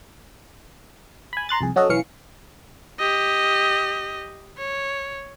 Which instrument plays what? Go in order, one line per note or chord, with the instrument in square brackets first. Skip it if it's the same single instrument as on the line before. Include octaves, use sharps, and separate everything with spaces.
[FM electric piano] G#5 B5
A#5 C6 F#6 A6
C2 F2 G#4
F#3 C#4 F#4 A4 D#5
B1 E3 C#4 F5 C#7
[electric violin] G4 D#5
C#5